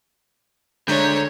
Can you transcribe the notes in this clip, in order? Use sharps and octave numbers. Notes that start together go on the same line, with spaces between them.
D3 G#3 A3 D4 C#5 A#5 G6